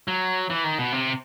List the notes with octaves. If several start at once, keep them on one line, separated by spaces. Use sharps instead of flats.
F#3
E3
D#3
B2
C3